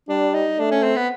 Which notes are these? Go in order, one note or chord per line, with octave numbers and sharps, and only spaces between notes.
G3 D4
D#4
A3 D4
C#4
C4
B3